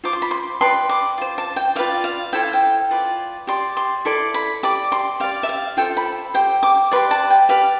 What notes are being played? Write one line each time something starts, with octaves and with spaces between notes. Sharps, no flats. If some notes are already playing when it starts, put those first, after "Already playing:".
F4 C5 D6
C6
B5
C6
G4 B4 D5 C6
D6
F4 C5
A5
G5
F4 B4 D5 F5
F5
E4 A4 C5 G5
F5
G5
F4 B4 D5
G4 D5 C6
C6
E4 A4 D5 C6
B5
G4 D5 D6
C6
G4 D5 F5
E5
F5
F4 A4 C5 G5
B5
G4 C5 G5
D6
G4 B4 D5 C6
A5
G5
G4 B4 D5 F5